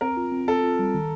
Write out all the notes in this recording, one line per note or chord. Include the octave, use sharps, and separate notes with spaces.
C4 A#4
F4
C4
C4 A4
F4
G3
D#3